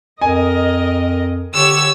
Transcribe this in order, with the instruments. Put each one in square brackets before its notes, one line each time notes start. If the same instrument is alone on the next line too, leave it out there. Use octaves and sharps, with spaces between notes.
[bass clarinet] F2 [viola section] A#4 D#5 [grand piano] G#5
[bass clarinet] D3 [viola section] G4 C#5 [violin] E6